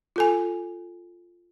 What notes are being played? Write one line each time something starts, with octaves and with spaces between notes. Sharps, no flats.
F4 A4 G#5